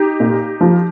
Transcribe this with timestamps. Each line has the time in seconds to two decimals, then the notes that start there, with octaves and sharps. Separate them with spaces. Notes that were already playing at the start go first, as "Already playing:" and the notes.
Already playing: D#4 G4
0.20 A#2
0.61 F3